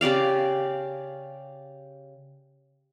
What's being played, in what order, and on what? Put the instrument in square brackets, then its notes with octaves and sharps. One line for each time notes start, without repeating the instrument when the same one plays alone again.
[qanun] C#3 G4 D5 F5